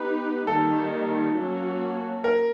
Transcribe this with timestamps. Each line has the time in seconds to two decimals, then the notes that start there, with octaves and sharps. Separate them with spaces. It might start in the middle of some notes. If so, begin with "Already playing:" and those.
Already playing: B3 D#4 G4 B4
0.47 D#3 G3 A#3 D#4 A4
1.36 F#3 A#3 C#4 F#4
2.24 A#4